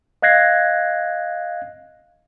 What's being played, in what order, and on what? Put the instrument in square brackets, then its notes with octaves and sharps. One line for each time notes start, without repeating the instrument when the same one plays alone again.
[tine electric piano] D#5 F5 F#6 G#6 A#6 C7